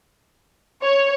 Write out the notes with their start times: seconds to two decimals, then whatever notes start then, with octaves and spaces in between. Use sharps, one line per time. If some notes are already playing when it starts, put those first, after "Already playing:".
0.84 C#5